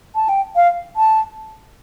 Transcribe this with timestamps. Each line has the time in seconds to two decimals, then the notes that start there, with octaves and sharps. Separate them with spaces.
0.15 A5
0.29 G5
0.56 F5
0.96 A5